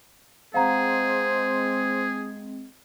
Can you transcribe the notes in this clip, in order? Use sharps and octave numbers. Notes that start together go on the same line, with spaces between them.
G#3 C4 G#4 C5 F5 F#5 A#5